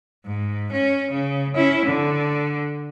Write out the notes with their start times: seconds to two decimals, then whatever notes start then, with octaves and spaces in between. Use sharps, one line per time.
0.25 G#2
0.72 C#4
1.11 C#3
1.55 C#4 E4
1.86 D3